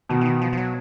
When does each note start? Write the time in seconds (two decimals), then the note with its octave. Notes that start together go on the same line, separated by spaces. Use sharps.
0.09 B2 D#3
0.21 E3
0.25 D#3
0.41 F3
0.53 F3
0.57 F#3